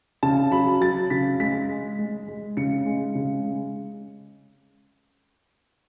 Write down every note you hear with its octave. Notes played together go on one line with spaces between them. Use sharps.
C#3 A5
F#3 B5
F#3 A6
C#3 B6
G#3 B6
G#3
G#3
G#3
C#3 C#7
G#3
C#3
G#3